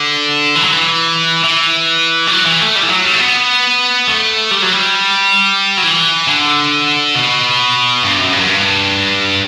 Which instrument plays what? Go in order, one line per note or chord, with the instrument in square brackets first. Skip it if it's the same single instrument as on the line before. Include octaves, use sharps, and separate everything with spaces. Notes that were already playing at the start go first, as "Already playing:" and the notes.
Already playing: [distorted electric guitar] D3
E3
F#3
E3
E3
G3
F#3
E3
A3
G3
E3
F#3
G3
A3
B3
A3
G3
F#3
G3
F#3
E3
D3
B2
G2
F#2
G2
F#2
G2